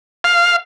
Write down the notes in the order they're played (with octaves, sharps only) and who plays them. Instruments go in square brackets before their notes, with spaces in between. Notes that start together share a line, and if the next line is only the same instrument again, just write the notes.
[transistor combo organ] F5